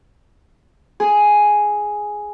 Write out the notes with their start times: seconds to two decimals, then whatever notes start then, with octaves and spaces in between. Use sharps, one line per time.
1.00 G#4